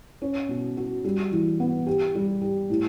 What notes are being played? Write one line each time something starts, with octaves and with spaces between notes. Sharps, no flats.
C#4
B2
F#4
G3
E3
B3
G4
G3
G4
A2